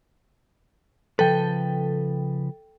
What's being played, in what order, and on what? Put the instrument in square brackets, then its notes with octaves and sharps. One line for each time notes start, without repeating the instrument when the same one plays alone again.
[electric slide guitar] C#3 F3 B4 [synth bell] A4 G5